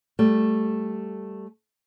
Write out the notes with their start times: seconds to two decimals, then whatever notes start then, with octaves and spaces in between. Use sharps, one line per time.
0.19 G3 A3